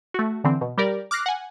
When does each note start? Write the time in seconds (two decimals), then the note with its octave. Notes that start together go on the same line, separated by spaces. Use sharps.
0.14 A3 F#4
0.44 D3 E3 C4
0.61 B2
0.78 G3 G4 A#4 D5
1.11 D6 F6 F#6 A#6 C7
1.26 F#5 G#5